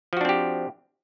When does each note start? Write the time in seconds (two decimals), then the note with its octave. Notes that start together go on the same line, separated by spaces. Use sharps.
0.13 F3
0.17 F#4
0.21 D4
0.25 C4
0.29 G4